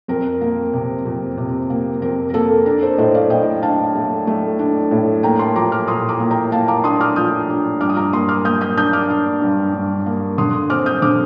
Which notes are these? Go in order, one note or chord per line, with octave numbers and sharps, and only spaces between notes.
F2 A#4
A#3
C3
F2
C3
A#3
F2 A#4
A#4
A#3 A4
D4 A#4
A4 C5
A2 C5 D#5
D5 F5
A2 D#5 G5
D4 F5 A5
A3
A3
D4
A2
A#3 G5 A#5
A5 C6
F3 A#5 D6
D6 F6
A#2 C6 D#6
A#5 D6
A#3
G5 A#5
A#3 F5 A5
A#5 D6
D4 C6 D#6
D6 F6
F3 D#6 G6
D4
G2 D6 F6
D#6
A#5 D6
A#3 C6 D#6
D6 F6
A#3 D#6 G6
D#6 G6
D4 D#6 G6
D6 F6
D4
G2
G2
A#3
D3 C6 D#6
C4 D6 F6
D#6 G6
D3 D6 F6